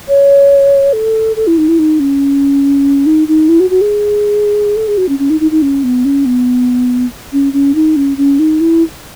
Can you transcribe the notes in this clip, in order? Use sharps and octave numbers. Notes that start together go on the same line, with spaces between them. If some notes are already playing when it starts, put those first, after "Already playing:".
C#5
A4
A4
E4
D#4
E4
D#4
C#4
D#4
D#4
E4
F#4
F#4
G#4
A4
G#4
F#4
C#4
C#4
D#4
D#4
D#4
C#4
B3
C#4
B3
C#4
C#4
D#4
C#4
C#4
D#4
E4